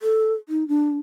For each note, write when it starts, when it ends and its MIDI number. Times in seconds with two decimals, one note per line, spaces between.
0.01 0.33 69
0.49 0.67 63
0.68 0.99 62